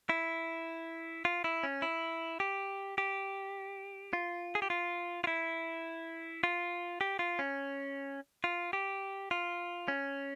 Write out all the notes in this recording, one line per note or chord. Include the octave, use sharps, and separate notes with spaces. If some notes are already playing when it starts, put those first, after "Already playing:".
E4
F4
E4
C#4
E4
G4
G4
F4
G#4
G4
F4
F4
E4
F4
G4
F4
C#4
F4
G4
F4
C#4